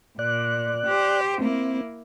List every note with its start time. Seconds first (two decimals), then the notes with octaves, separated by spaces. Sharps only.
0.19 A#2 D5 F#6
0.85 G4 C5
1.40 A#3 C4 E4